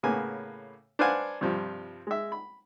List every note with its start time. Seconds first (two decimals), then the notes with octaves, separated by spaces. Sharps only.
0.03 A2 C#3 A#3 B3 G#5
0.99 D4 B4 C5 F5 F#5 G#5
1.41 G2 C3 F3 G3
2.07 G#3 E5
2.32 B5